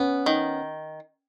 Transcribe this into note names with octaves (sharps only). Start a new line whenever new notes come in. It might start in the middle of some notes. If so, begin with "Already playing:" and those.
Already playing: B3 C#4
D#3